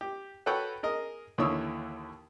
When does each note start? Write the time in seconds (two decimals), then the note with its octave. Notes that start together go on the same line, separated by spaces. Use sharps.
0.01 G4
0.46 F#4 A4 B4 C#5 F#5 G5
0.83 G#4 A#4 D#5
1.38 D#2 D3 E3 C#5 D#6 E6